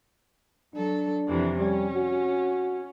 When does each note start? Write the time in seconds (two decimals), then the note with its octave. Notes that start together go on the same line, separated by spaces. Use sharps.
0.74 F#3 D4 A4
1.28 F2 C3 E3
1.58 G3 C#4
1.95 F#4